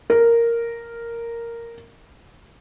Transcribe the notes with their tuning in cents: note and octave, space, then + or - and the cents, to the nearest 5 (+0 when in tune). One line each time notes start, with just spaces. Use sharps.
A#4 -5